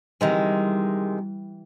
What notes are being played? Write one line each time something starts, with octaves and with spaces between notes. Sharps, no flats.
C3 D#3 E3 G3 G#3